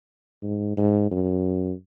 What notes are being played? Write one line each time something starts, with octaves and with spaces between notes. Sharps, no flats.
G#2
G#2
F#2